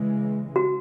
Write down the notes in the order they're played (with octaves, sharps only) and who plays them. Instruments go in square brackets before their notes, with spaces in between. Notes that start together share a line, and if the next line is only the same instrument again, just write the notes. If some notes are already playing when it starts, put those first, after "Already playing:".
Already playing: [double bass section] C#3 E3 G#3
[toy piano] F#4